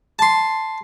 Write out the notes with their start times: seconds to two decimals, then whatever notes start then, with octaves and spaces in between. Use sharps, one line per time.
0.19 A5 C6